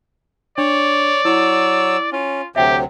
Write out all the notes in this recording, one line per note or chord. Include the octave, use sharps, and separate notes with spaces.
D4 C#5 D5
F#3 E4 C#5 E6
C#4 F4
D2 C3 F#3 G4 E5 G5